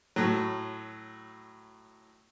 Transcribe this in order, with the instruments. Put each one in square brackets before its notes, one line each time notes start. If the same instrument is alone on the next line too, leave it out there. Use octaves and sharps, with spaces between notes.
[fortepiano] A2 F#3